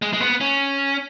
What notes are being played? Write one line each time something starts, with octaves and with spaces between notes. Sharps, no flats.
G#3
G#3
B3
C#4